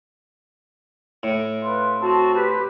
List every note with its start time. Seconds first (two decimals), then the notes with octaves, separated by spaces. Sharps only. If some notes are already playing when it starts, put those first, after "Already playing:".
1.23 A2
1.64 F4 B4
2.02 C4 F#4 A5
2.34 G4 B4